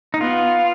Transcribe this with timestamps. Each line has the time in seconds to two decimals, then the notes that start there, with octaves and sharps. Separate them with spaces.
0.14 D#4
0.20 B3 F4